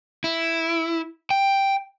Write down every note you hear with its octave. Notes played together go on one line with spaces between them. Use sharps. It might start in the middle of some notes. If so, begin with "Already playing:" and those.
E4
G5